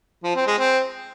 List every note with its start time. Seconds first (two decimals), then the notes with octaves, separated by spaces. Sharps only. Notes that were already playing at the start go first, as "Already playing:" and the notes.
0.23 F3
0.35 C4
0.47 G#3
0.58 C4